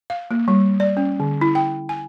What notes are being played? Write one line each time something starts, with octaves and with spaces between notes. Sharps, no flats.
F5
A#3
G3
D5
C#4
D3
E4
G5
G#5